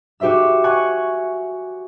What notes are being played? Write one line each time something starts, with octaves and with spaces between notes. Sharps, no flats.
F#4 G4 C5 E5 E6
F#5 G#5 C#6 F#6